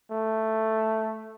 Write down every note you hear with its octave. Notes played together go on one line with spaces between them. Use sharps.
A3